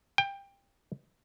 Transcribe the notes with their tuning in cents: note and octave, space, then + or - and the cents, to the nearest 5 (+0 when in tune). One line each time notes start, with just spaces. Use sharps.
G5 +20